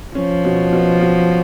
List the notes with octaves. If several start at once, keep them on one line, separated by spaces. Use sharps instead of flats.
F3 C#4
B2
B2
B2